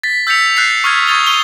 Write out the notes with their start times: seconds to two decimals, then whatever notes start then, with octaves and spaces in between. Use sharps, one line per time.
0.03 A6 B6
0.27 E6 G6 A6 B6 C#7 F7
0.56 F#6 G6 A6 C7
0.84 C#6 D#6 F6 F#6 G#6 B6
1.07 C#6 D#6 G#6 A6 F7 G7
1.26 C#6 D#7 G7